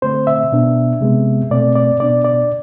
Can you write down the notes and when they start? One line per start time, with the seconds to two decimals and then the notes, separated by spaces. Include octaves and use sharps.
0.02 D3 A3 C4 C5
0.27 E5
0.52 B2 B3 D4
1.01 C3 G#3 B3
1.50 B2 A3 C4 D5
1.76 D5
2.00 B2 B3 D4 D5
2.25 D5